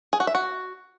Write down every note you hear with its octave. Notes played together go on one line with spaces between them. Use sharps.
G#4
F#4
E5
F#4